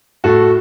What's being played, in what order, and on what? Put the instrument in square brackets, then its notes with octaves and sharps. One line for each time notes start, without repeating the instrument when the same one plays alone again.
[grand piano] A2 F#4 A4